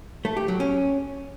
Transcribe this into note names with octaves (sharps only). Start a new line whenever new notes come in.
A3
G4
F#3
C#4